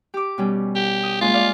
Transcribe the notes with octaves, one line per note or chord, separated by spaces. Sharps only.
G4 D6
B2 G3 C#4
G4
D#6
G#3 A#3 C#4 F4
D5 F5